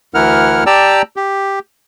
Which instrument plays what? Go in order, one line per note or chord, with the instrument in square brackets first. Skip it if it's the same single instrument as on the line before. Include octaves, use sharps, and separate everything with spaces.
[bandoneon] D2 E3 E4 A#4 F#5 F6
G4 D5 G5 A5 A#5 E6
G4